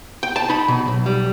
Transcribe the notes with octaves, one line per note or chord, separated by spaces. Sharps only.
G5
A5
D#4 B5
B2
B1
G3